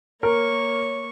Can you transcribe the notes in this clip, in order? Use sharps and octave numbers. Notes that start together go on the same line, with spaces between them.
A#3 A#4 C#5 C#6